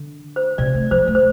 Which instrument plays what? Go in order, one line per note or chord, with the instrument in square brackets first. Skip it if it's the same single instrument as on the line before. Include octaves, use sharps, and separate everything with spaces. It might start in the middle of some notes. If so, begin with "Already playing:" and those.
Already playing: [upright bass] D3
[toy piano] C5
[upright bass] C3 [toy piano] D5
[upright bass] A3
[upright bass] F3 [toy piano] C5
[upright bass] A3
[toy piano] C5